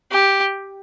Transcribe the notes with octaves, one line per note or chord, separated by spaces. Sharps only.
G4